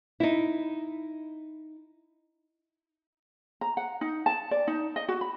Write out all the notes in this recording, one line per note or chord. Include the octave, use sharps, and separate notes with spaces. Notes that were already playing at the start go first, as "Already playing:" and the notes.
D#4 E4
A#5
F#5
D#4
A5
D5
D#4
D#5
F#4
B5